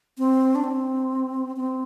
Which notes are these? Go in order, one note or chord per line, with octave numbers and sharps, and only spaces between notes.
C4
D4
C4
C4